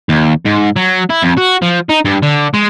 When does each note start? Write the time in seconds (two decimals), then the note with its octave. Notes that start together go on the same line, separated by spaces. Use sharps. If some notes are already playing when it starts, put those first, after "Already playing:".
0.09 D#2
0.46 G#2
0.76 F#3
1.10 E4
1.23 F2
1.38 F#4
1.62 F3
1.89 D#4
2.05 G2
2.23 D3
2.54 G#3